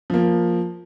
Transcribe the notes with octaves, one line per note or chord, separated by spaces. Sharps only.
F3 A#3